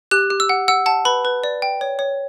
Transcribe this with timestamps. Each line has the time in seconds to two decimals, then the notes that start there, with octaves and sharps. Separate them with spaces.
0.11 G4 F#6
0.30 G4
0.40 E6
0.49 F#5
0.68 F#5 E6
0.86 F#5 A5
1.05 B4 B5
1.25 B4
1.44 D5
1.62 G5
1.81 C#5
1.99 C#5